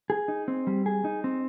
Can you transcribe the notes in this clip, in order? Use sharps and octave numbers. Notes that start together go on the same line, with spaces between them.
G#4
D#4
C4
G3
G#4
D#4
C4